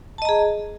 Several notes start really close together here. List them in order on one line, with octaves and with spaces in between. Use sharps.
A5 D#5 A#5 G#4